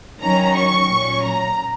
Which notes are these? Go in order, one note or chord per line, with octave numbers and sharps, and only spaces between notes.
D#3 F#3 C#4 A#5
C#6
A#2 F#3 C#4
A#5